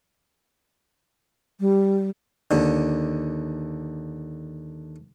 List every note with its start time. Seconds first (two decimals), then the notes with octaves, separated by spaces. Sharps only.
1.60 G3
2.51 D#2 D3